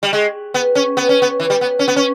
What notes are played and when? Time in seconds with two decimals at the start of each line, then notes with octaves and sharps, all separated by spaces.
0.03 G3
0.13 G#3
0.54 B3
0.75 C#4
0.97 B3
1.09 C#4
1.22 B3
1.40 E3
1.50 G3
1.61 B3
1.79 C#4
1.88 B3
1.96 C#4